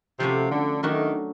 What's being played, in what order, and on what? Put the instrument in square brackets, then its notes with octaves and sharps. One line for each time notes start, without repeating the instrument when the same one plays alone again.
[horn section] C3 [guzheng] F3 A3 C#4 F#4
[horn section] D3
[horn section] D#3 [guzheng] F#3 A3 D4 F#4 A#4